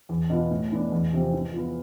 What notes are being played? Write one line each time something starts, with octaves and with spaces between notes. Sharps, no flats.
E2
B2 B3 F4
A2
E3 B3 D4
E2
C3 F3 C4
E3
B3 F4